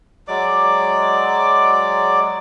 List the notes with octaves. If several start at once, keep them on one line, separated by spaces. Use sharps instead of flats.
F#3 G#3 D5 D6